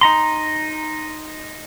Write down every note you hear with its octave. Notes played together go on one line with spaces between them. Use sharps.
D#4 A#5 C6